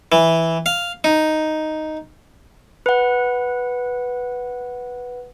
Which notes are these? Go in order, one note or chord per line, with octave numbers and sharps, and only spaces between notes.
E3
F5
D#4
B4 F#5